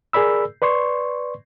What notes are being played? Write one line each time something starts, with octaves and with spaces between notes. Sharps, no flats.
G#4 A#4 D5 B5 E6
B4 D5 C6 C#6